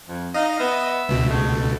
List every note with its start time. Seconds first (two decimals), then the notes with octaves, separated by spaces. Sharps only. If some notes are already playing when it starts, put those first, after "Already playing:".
0.08 F2
0.34 D#4 D#5 F5
0.59 B3 E5
1.08 C#2 B2
1.29 A3 G#4
1.52 A4